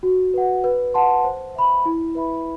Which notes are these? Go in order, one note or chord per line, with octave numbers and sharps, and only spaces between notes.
F#4
B4 F#5
B4
F#5 A5 C6
C5
E5 B5
E4
B4 E5 B5